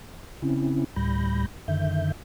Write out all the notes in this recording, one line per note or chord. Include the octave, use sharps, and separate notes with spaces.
C#3 C4 C#4 E4
D2 A2 G3 B5 G6 A#6
F#2 D3 D#3 E5 G6